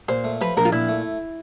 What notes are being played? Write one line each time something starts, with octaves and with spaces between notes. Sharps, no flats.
A#2 C5
A3
F3 B4
A#1 A#4
F4
A#2 E4
A3